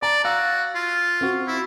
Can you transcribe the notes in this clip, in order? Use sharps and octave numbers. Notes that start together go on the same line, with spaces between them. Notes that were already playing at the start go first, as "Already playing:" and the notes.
D5 A#5
F#4 F5 E6
F4
C4 F#4
E4